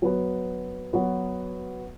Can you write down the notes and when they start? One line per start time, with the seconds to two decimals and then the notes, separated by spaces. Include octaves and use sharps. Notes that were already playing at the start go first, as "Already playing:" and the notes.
0.02 F#3 B3 F#4 B4
0.93 F#3 B3 F#4 B4